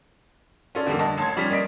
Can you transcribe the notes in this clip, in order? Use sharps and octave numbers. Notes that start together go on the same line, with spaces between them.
C#4 F4 A4 D5
F2 D3 G3 A3 A#3
D3 D#5 A5
A1 A5 C6 G#6
F3 G3 C#4 B6
A#3 D5 D#5 B6 D7